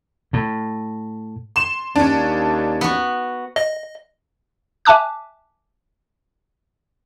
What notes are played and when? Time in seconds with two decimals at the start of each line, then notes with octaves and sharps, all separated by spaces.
0.33 A2
1.56 C6 E7
1.96 D#2 C#4 D4
2.81 B3 F#4
3.56 D#5
4.85 E5 G#5 A5 D6 F#6